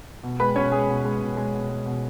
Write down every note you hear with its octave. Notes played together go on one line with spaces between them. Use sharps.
B2
G#3 B4 B5
B2 C#4 C#5
G#3 G#4
B2
G#3
B2
G#3
B2
G#3
B2